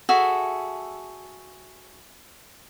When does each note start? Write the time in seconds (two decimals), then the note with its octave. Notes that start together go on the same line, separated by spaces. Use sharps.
0.09 F#4 G#4 A4 E5